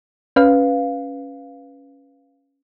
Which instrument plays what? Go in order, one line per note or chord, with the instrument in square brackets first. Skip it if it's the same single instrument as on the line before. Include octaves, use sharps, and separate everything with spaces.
[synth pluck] C#4 B4 F5